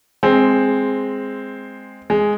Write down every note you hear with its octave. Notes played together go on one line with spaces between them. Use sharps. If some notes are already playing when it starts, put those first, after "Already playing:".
G#3 C4
G#3